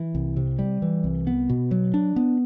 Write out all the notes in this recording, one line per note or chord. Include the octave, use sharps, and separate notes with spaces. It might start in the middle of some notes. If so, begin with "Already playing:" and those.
Already playing: E3
C2
C3
G3
E3
C2
B3
B2
F#3
D4
B3